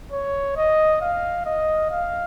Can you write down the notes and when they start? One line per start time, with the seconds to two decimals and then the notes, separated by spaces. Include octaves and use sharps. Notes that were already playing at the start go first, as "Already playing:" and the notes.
0.12 C#5
0.56 D#5
1.01 F5
1.45 D#5
1.91 F5